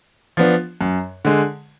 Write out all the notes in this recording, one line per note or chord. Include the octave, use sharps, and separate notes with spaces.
F3 B3 D4
F#2
D3 G#3